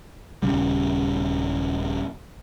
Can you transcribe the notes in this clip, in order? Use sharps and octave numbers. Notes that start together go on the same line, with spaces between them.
D#1 G#1 C#3 G3